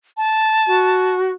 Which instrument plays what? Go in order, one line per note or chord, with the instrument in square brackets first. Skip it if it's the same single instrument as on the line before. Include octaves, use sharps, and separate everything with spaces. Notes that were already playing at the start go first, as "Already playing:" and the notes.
[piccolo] A5
[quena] F#4